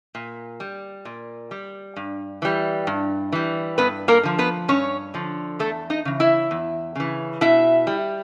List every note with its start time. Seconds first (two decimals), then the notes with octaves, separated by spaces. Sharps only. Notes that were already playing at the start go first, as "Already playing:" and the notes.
0.15 A#2
0.60 G3
1.05 A#2
1.51 G3
1.96 G2
2.42 E3 G3
2.87 G2
3.32 E3 G3
3.78 G2 B3 B4
4.08 A#3 A#4
4.23 D3 F3
4.38 B3 B4
4.68 G2 C#4 C#5
5.14 D3 F3
5.59 E2 A3 A4
5.90 D#4 D#5
6.05 C#3 E3
6.20 E4 E5
6.51 E2
6.96 C#3 E3
7.41 B2 E4 E5
7.87 G3